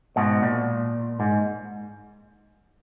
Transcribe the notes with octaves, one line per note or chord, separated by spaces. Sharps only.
G#2 B2
A#2
G#2